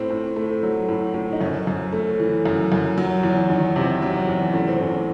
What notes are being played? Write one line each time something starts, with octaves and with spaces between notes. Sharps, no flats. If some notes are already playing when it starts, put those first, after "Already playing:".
Already playing: A2 C4
A2
A3
F#3
A2
A2
D#4
F#2 C#4
F#2
A3
E3
F#2
F#2
F#3
E2
D#3
C3
F#3
E2
A2 C#4
C4
A2 C#4